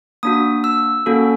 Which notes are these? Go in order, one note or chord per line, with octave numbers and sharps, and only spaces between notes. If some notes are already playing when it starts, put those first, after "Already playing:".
A#3 D4 F#4 D#6
E6
A#3 C#4 F#4 A4